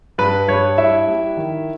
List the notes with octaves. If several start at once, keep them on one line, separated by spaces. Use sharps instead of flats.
G2 B4
G2 C#5
G2 E4 E5
G3
D#3